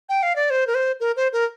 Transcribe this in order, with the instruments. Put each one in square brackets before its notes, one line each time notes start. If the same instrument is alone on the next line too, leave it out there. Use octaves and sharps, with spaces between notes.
[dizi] G5
F5
D5
C5
A#4
C5
A#4
C5
A#4